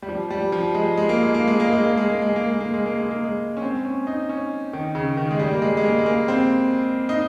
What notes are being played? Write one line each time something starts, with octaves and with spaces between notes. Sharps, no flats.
G3
F3
G3
F3
G#3
G#3
A#3
G#3
A#3
G#3
A#3
G#3
A#3
G#3
A#3
G#3
A#3
G#3
A#3
G#3
A#3
G#3
A#3
G#3
C#4
C4
C#4
D#4
C#4
D#3
C#3
D#3
G#3
G3
A#3
G#3
G#3
A#3
G#3
A#3
C4
D#4